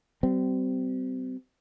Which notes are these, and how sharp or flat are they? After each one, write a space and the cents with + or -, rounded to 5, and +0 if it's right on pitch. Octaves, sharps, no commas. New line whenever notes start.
G3 -35 C4 -30